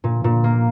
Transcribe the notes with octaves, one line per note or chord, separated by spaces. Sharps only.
A#2
A#2
A#3